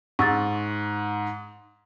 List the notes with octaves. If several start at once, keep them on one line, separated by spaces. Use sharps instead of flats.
G#2 C#6 E6 A6